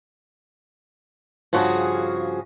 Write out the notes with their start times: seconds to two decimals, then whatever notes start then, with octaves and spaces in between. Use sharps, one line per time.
1.53 G2 C#3 F3 F#4 G#4